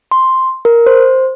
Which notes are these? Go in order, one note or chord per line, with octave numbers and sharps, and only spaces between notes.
C6
A#4
C5